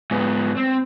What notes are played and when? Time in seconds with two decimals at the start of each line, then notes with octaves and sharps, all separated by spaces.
0.11 G#2 B3
0.57 C4